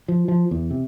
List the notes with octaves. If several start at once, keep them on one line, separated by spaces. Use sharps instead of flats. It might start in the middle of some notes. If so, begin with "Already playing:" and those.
F3
F3
E2
C3